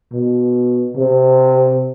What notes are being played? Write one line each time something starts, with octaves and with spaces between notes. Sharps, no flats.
B2
C3